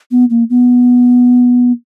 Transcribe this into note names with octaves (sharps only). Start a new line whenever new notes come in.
B3
A#3
B3